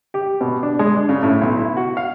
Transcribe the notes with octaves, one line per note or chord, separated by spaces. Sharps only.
G4
B2
D4
G#3
D4
C#3
A2
B1
E4
F#4
F5